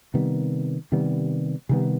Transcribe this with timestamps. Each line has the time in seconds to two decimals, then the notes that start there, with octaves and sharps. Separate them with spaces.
0.14 C3 D#3 G3 B3
0.92 C3 D#3 G3 B3
1.69 C3 D#3 G3 B3